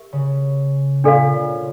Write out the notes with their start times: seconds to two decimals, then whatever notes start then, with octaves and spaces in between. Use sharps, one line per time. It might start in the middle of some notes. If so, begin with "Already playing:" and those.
Already playing: G4 A#4 E5
0.13 C#3
1.04 A#2 D4 A4 D5 F5
1.34 C#3